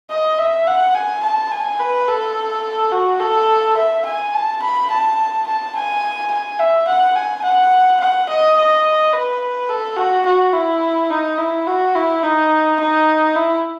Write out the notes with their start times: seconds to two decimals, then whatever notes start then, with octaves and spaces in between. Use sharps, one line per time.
0.10 D#5
0.38 E5
0.67 F#5
0.95 G#5
1.23 A5
1.51 G#5
1.79 B4
2.08 A4
2.92 F#4
3.20 A4
3.76 E5
4.05 G#5
4.34 A5
4.62 B5
4.90 A5
5.46 A5
5.75 G#5
6.31 G#5
6.59 E5
6.87 F#5
7.15 G#5
7.44 F#5
8.00 F#5
8.29 D#5
8.57 D#5
9.13 B4
9.69 A4
9.97 F#4
10.25 F#4
10.53 E4
11.10 D#4
11.38 E4
11.67 F#4
11.95 E4
12.23 D#4
12.79 D#4
13.35 E4